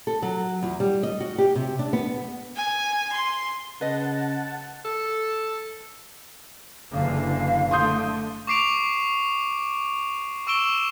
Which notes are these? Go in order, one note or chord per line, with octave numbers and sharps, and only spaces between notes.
A4
F#3
E2
G3
D#5
F#4
G4
C3
D4
B3
G#5
C6
C#3 B4 D#5 F#5 A5
A4
F#1 D3 E3 F5
D3 A3 C6 D#6 G6
C#6 D6 C7 D7 F7
C#6 E6 D7 E7 G7